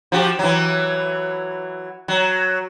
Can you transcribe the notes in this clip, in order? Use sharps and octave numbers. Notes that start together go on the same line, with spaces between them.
F3 F#4 G4
E3 F#3
F#3